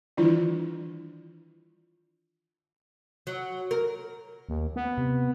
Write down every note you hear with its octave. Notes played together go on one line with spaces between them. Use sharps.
D#3 E3 G3 D4 E4 F4
F#3
A#4
D#2
B3
C3